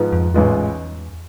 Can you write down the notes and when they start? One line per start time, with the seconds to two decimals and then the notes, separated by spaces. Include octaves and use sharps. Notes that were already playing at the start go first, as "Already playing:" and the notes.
Already playing: G#2 F3 B3
0.12 F2
0.33 A1 E2 G#2 G#3 B3 F4